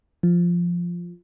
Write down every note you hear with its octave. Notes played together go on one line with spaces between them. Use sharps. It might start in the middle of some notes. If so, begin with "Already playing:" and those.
F3